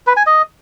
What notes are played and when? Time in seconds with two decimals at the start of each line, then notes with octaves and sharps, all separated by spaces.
0.07 B4
0.17 G#5
0.26 D#5